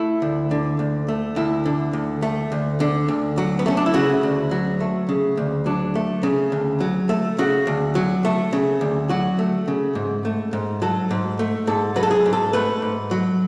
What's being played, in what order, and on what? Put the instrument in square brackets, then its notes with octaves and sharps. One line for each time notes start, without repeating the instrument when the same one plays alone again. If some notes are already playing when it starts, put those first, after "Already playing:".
Already playing: [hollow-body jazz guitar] A3 E4
D2
D3
D2
A3
D2 E4
D3
D2
A3
D2
D3
D2
F#3
B3
A3 C#4
D4
E4
C#3 F#4
D2
F#3
A3
C#3
D2
F#3 D4
A3
C#3
D2
F#3
A3
C#3 F#4
D2
F#3
A3
C#3
D2
F#3 F#4
A3
C#3
G#2
A3
G#2
F#3 A4
G#2
A3
G#2 A4
F#3 B4
A4
G#4
G#2
A4
A3 B4
G#2
F#3